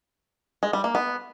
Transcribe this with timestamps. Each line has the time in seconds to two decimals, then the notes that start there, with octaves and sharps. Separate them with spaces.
0.63 G#3
0.73 G3
0.84 A#3
0.95 B3